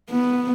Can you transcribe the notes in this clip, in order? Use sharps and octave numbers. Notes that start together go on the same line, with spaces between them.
B3